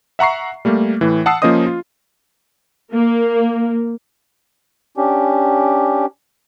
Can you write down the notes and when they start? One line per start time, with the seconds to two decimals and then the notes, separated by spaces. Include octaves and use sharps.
0.19 E5 F#5 A#5 C#6 C7
0.65 G3 A3 A#3
1.01 A2 E3
1.26 F#5 A5 D#6 E6 C7
1.42 F3 A#3 C#4 C5 D#5 D#6
1.66 F4
2.92 A#3
4.97 C#4 D4 G4